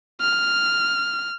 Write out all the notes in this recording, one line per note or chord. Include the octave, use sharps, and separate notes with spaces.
F6